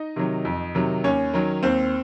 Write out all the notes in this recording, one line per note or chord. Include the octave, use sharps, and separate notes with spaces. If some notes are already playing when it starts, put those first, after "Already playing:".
Already playing: D#4 D#5
C3 D#3 F#3
F2
C3 D#3 F#3
D#2 C#4 C#5
D#3 F#3
D#2 C4 C5